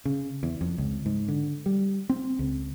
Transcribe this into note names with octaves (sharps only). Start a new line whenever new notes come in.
C#3
E2
F2
C#2
G#2
D3
G3
C4
C#2